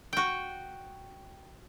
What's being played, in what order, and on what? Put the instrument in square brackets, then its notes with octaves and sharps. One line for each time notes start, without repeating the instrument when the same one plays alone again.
[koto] F#4 G5